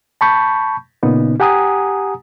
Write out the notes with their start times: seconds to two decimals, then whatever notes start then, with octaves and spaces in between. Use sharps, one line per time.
0.21 A5 B5 C#6 G6
1.03 A#2 C#3 B3 D#4
1.40 G4 F#5 G#5 A#5 D#6